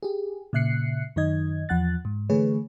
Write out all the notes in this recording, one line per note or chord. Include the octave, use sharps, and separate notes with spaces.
G4 G#4
A#2 C#3 E5 F#6 C7 C#7
F#2 D#3 D#4 D#5 G#6
E2 F3 F#5 F#6 A6
G#2
D3 E3 A3 G#4 B4 C#5